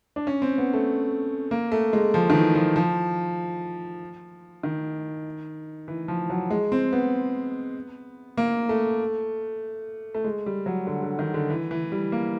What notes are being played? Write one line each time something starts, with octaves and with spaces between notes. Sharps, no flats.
D4
C#4
C4
B3
A3
A#3
A3
G#3
F3
D#3
E3
F3
F3
D#3
E3
F3
F#3
G#3
C4
B3
A#3
A3
A3
G#3
G3
F#3
D3
D3
D#3
D3
E3
E3
G3
A#3